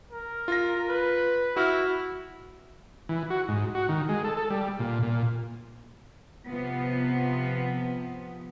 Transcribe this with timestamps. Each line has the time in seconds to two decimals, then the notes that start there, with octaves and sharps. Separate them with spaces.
0.11 A#4
0.48 F4 A#6
0.89 B4
1.56 E4 F#4 F6
3.09 E3
3.30 F#4
3.48 G#2
3.75 F#4
3.89 D#3
4.09 G#3
4.24 A4
4.37 A4
4.50 G3
4.79 A#2
5.03 A#2
6.45 C3 F3 B3